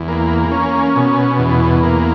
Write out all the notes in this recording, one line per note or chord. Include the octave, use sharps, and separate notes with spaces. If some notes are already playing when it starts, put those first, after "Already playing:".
Already playing: E2
A#3
C#4
B2
E2
A#3